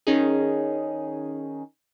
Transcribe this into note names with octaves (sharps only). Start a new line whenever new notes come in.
D#3 C#4 D#4 G#4